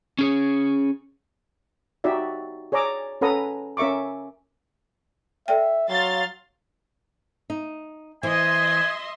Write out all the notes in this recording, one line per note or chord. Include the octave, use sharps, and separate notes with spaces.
C#4 G#4 C#5
D#4 F#4 G4 D5 E5
G#4 C#5 D5 A#5 D6 E6
C#4 A4 B4 F#5 A#5 D#6
C#4 A#4 E5 C#6 D6
A4 D5 E5 G5
F#3 F5 C6 A6
D#4
E3 C5 D#5 E5 G#5 C6